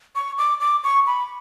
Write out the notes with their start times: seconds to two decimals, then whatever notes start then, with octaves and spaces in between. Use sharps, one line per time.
0.15 C#6
0.38 D6
0.60 D6
0.84 C#6
1.07 B5